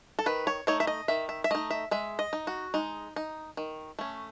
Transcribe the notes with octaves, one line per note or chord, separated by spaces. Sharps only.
A4
D#3 B4
C#5
A3 D#4 C#5
E5
D#5
D#3 E5
E5
E5
A3 D#4 D#5
E5
G#3 E5
D#5
D#4
F#4
G#3 D#4
D#4
D#3
A3 C#4